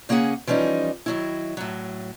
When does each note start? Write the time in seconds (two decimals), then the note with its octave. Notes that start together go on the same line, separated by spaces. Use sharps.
0.09 C#3 A#3 C#4 G#4 F#5
0.47 E3 F3 G3 C#4 D#4
1.06 D#3 F#3 E4
1.57 A2 F#3